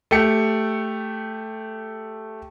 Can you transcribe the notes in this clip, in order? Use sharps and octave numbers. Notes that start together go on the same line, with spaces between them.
A3 G4 C#7